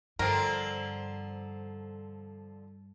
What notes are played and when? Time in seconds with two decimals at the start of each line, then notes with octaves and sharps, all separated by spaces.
0.19 G2 D3 F3 C4 A#4